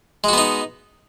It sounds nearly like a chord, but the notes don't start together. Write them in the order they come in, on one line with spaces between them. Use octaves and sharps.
G#3 F#4 B3 D#4